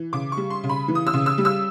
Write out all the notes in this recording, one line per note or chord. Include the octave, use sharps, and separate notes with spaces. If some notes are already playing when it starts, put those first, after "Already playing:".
Already playing: E3
C#3 D6
C#6
G3
C6
C#3
B5
E3
D#6
E6
C#3
E6
G3
E6